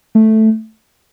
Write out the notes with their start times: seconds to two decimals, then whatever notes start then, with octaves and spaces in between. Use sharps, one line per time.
0.15 A3